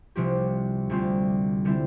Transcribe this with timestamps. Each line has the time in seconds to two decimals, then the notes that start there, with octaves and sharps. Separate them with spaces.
0.16 C2 C3 F3 C4 G4
0.90 D2 C3 G3 C4 F4
1.65 D3 G3 C4 E4